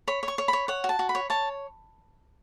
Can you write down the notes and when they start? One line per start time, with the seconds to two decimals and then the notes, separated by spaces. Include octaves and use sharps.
0.08 C#5 B5
0.23 C#5
0.28 C#6
0.38 C#5
0.48 C#5 B5
0.68 C#5 F#5
0.84 F#4
0.89 A5
0.99 F#4
1.09 B5
1.15 C#5
1.30 C#5 A5